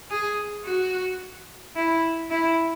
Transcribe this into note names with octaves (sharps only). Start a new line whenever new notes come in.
G#4
F#4
E4
E4